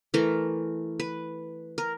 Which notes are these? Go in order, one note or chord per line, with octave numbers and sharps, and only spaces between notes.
E3 A3 A#4
B4
A#4